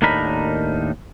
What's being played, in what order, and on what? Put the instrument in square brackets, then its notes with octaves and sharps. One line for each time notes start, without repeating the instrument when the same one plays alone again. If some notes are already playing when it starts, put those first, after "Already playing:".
[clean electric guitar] D#2 A2 D4 D#4 A#4 B5